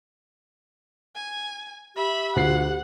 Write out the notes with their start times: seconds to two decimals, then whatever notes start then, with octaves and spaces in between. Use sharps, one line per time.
1.15 G#5
1.96 G4 E5 B5
2.36 D2 F4 F#5 C7